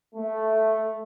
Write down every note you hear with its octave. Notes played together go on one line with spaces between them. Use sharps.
A3